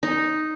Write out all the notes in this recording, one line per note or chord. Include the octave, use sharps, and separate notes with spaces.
D#4